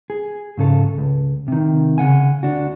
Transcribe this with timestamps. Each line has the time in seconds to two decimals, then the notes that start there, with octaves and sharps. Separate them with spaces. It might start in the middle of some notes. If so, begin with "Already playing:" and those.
0.10 G#4
0.58 G#2 C#3 A4
0.98 C#2
1.48 C3 D#3
1.98 C#3 F#5 G#5
2.43 D2 D4 F#4